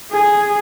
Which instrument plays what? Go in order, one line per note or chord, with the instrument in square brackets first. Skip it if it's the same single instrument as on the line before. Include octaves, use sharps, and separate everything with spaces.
[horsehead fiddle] G#4